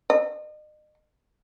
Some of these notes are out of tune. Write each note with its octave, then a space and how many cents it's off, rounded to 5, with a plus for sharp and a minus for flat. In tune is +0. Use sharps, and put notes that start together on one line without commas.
D#5 -40